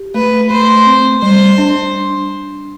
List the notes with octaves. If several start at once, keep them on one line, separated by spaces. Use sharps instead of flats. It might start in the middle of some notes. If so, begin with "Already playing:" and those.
Already playing: G4
A3 B4
A3 C5
C4
G3 C5
D4